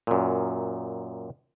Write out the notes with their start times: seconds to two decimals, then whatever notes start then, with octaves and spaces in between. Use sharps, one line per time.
0.07 F#2 A#2